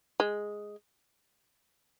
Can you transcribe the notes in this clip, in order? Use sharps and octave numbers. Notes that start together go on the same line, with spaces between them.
G#3